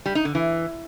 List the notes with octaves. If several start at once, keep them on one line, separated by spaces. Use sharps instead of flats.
G3
D#4
D3
E3